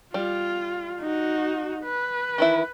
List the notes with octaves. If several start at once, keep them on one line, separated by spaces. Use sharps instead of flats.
G3 F4
D#4 F#4
B4
D#3 E3 E4